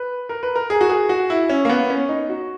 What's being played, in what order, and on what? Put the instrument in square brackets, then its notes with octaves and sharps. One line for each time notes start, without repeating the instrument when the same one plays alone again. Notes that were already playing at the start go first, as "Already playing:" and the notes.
Already playing: [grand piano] B4
A#4
B4
A#4
G#4
F#4
G#4
F#4
E4
C#4
A#3
B3
C#4
D#4
F#4